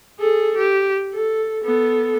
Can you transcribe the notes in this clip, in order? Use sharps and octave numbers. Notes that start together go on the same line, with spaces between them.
G#4 A4
G4
A4
B3 A4